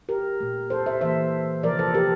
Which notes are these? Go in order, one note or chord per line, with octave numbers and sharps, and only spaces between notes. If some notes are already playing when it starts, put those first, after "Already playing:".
G4 A#4
A#2 A3
A4 C5
C5 E5
E3 A#3 C5 E5
C3 F3 A3 A#4 D5
A4 C5
G4 A#4